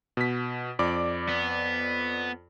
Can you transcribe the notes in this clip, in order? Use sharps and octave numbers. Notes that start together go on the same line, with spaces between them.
B2 B6
F2 D5 D6
B3